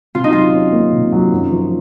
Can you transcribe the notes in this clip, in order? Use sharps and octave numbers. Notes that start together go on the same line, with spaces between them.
C3 F4
D#4
F#3 F4
C#4
A#3
C3
F#3
F#2
F3